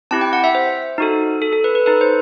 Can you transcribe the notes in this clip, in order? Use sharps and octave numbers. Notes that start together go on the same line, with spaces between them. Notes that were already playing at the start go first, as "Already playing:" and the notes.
C4 E4 G4 A5
G5
F#5
E5
C5
D#4 F#4 A4
A4
A4
B4
B4
D#4 A4 B4
C5